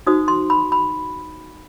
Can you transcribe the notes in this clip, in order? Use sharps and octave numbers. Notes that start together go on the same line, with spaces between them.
D#4 F#4 C5 D#6
C6
B5
B5